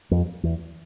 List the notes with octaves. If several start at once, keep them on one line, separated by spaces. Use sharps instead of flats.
F2
E2